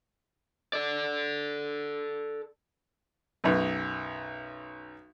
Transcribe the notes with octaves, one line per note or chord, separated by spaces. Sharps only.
A4 D5
B1 F#2